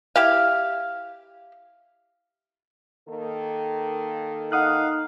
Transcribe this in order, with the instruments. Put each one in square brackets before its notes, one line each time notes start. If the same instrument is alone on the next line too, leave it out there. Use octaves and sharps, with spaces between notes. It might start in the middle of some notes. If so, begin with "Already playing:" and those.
[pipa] E4 G4 F5
[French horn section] D#3 A#3 A4
[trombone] D#4 [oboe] F5 [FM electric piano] F#5 D#6 F#6